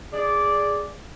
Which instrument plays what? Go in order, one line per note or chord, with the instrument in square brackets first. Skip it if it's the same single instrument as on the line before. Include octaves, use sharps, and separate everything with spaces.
[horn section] G#4 D5